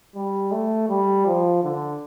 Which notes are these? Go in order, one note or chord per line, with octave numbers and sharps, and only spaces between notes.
G3
A3
G3
F3
D3